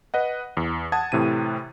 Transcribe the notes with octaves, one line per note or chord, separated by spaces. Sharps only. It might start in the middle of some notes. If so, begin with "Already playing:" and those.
B4 D#5 F#5
E2
F#5 A5 D#6 G#6
A2 C3 E3 D#7